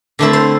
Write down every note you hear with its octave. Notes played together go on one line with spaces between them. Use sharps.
D3 A3 C4 E4 E5
C5